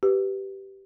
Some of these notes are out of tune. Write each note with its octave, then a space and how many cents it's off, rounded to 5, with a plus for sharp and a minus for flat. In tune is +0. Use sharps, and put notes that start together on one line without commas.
G4 -15 B4 +0